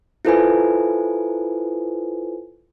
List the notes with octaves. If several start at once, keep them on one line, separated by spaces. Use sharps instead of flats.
E4 F4 A4 B4 C5 G#5